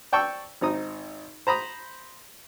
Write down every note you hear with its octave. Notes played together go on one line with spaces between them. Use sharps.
D5 G5 A5 C#6 E6
G#1 C4 D#4 D#6
C5 A#5 B5 D#6